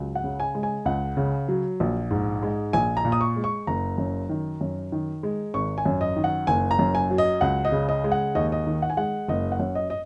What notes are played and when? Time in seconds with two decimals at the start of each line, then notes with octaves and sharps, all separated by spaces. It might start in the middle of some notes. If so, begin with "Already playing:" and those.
Already playing: C#2 F#3
0.15 F#5
0.24 C#3
0.40 G#5
0.55 G#3
0.63 G#5
0.85 C#2 F#5
1.17 C#3
1.48 F#3
1.80 A#1
2.11 G#2
2.42 G#3
2.73 A#1 G#5
2.97 A#5
3.05 A#2
3.12 D#6
3.21 C#6
3.36 G#3
3.44 C#6
3.67 F#1 A#5
3.98 F#2
4.29 D#3
4.61 F#2
4.92 D#3
5.23 G#3
5.54 G#1 C#6
5.78 G#5
5.86 F#2
6.01 D#5
6.16 D#3
6.24 F#5
6.47 F#1 G#5
6.71 A#5
6.79 F#2
6.95 G#5
7.11 F#3
7.18 D#5
7.41 C#2 F#5
7.65 D#5
7.72 C#3
7.89 D#5
8.04 G#3
8.12 F#5
8.35 D#2 D#5
8.52 D#5
8.66 D#3
8.82 F#5
8.90 G#5
8.97 G#3 F#5
9.28 F#1 D#5
9.52 F#5
9.60 F#2
9.75 D#5
9.90 D#5